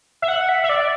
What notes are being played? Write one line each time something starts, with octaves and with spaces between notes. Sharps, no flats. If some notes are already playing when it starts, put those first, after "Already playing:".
E5
F#5
E5
E5
D5